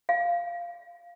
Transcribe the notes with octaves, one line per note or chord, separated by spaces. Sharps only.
F5